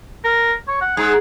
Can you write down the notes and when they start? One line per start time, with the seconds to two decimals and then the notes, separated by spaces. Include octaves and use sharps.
0.24 A#4
0.68 C#5
0.81 F#5
0.97 G#2 G#4